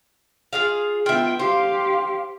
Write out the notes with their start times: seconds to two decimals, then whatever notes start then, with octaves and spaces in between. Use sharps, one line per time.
0.53 F4 G#4 F5
1.06 B3 F4 E5 G5
1.39 G4 C5 F5